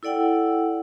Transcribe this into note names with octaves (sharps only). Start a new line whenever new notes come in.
E4 A4 D5 F#5 G5